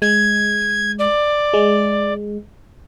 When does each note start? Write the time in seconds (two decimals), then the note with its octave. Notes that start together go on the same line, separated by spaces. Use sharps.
0.02 G#3 G#6
0.99 D5
1.54 G#3